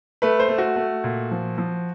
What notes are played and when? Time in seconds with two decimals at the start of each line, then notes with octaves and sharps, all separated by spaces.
0.22 A3 B4
0.40 C5
0.49 A3
0.58 F#4
0.76 A3
1.04 A#2
1.31 F3
1.58 F3